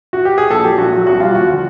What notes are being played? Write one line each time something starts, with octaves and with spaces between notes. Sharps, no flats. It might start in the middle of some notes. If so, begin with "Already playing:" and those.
F#4
G4
G#4
A#1 A4
A#2 F#3 G4
A#1 F#4
A#2 F#3 F#4
C2 F#4
B2 G3 F4
D#2 F#4
D3 F3